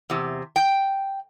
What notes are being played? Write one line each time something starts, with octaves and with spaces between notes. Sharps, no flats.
E2 C3
G5